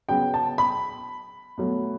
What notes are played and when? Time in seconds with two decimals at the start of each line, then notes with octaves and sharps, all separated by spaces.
0.09 C#3 F#3 B3 G5
0.34 A5
0.58 B5
1.58 B2 F#3 A3